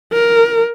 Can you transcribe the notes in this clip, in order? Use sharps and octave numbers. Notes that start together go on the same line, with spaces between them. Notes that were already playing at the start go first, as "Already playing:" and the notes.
A#4